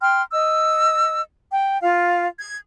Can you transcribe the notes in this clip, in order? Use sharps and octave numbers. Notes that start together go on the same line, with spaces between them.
G5 C6 F6
D#5 E6
G5
F4 F5
G#6